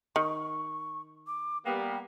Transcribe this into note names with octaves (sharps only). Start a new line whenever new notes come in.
D#3 C#6
D6
G3 A#3 B3 G5